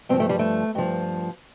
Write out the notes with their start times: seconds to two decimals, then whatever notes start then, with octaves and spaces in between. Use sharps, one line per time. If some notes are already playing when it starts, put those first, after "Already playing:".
0.09 G2 F3 C4
0.20 A3
0.29 G3
0.39 A3
0.75 G2 F3